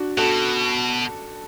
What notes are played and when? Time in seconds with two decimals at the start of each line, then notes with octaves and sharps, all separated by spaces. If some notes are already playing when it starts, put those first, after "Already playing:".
Already playing: D4 F#4
0.17 B2 F#4 A4